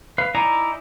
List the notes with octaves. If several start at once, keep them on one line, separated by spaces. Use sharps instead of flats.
B4 F5
D#4 E4 D5 G#5 A#5